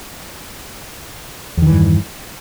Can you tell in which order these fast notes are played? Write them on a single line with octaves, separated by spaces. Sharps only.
E2 D#3 E3 G2